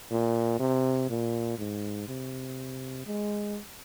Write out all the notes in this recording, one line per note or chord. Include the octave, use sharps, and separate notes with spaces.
A#2
C3
A#2
G#2
C3
G#3